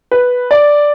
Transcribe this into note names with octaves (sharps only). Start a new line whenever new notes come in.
B4
D5